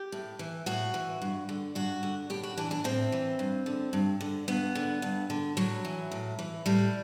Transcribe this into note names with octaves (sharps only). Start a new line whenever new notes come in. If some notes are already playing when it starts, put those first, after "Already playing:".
Already playing: G4
A2
E3
A2 F#4
E3
G2
D3
G2 F#4
D3
A2 G4
F#4
E3 D4
D4
A2 C4
E3
G2
D3
G2
D3
G2 B3
D3
G2
D3
A2 F#3
E3
A2
E3
A2 G3